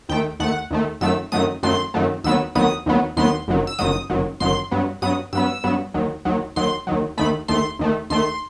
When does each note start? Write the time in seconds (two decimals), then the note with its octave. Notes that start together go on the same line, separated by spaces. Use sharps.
0.09 D#2 D#3 A3 G5
0.40 D#2 D#3 A3 F#5
0.71 D#2 D#3 A3
1.01 F#2 D#3 F#3 A3 E6
1.32 F#2 D#3 F#3 A3 D#6
1.63 F#2 D#3 F#3 A3 C6
1.94 F#2 D#3 F#3 A3
2.24 D#2 D#3 F#3 B3 E6
2.55 D#2 D#3 F#3 B3 D#6
2.86 D#2 D#3 F#3 B3
3.17 D#2 D#3 F#3 B3 C6
3.48 G1 F#2 D#3 F#3
3.67 E6
3.79 G1 F#2 D#3 F#3 D#6
4.10 G1 F#2 D#3 F#3
4.40 G1 F#2 D#3 F#3 C6
4.71 G2 F#3 B3
5.02 G2 F#3 B3 D#6
5.33 G2 F#3 B3 E6
5.64 G2 F#3 B3
5.94 D#2 D#3 F#3
6.25 D#2 D#3 F#3
6.56 D#2 D#3 F#3 C6
6.87 D#2 D#3 F#3
7.18 D#2 D#3 A3 B5
7.48 D#2 D#3 A3 C6
7.79 D#2 D#3 A3
8.10 D#2 D#3 A3 C6